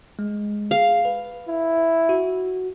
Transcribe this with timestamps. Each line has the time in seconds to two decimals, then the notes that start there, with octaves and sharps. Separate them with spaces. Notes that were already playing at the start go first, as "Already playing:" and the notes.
0.19 G#3
0.71 G#4 F5
1.05 B4
1.48 E4
2.09 F#4